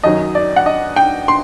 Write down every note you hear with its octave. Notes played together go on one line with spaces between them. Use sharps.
F#2 D#3 F#3 D#5
D5
F#5
D#5
G5
C6